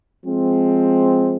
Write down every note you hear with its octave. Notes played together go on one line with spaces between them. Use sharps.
F3 G#3 C4